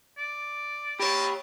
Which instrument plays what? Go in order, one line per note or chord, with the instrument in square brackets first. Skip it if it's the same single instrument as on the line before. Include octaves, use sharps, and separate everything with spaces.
[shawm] D5
[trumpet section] C4 D#5 A5 [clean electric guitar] G4 C#5 [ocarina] B5